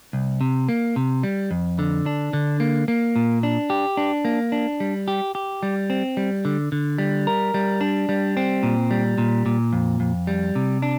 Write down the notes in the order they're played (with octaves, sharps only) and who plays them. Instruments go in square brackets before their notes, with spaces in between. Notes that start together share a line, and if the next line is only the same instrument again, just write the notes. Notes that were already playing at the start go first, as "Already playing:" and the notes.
[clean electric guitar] C2
C3
A#3
C3
G3
F2
D3
D4
D3
A#3
A#3
A#2
D4
G4
D4
A#3
D4
G3
G4
G4
G3
C4
G3
D3
D3
G3
A#4
G3
D4
G3
C4
A#2
G3
A#2
A#2
F2
F2
G3
C3
D4